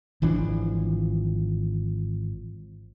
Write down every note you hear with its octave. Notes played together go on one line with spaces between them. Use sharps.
G#1 E3 F3 D4